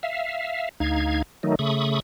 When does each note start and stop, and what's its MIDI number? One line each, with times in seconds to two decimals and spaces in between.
0.03 0.69 76
0.03 0.69 77
0.80 1.22 38
0.80 1.22 63
0.80 1.22 77
0.80 1.22 92
1.43 1.55 51
1.43 1.55 54
1.43 1.55 57
1.43 1.55 63
1.59 2.00 49
1.59 2.00 57
1.59 2.00 83
1.59 2.00 85
1.59 2.00 87